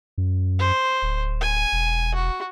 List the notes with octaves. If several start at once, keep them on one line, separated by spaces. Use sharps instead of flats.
F#2
C5
D1
G#5
E1
F#4